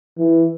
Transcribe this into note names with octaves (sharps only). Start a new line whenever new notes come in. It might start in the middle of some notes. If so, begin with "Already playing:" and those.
E3